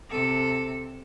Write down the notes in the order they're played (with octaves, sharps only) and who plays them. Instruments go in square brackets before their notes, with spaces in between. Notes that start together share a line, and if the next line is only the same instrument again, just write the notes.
[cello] C3 A4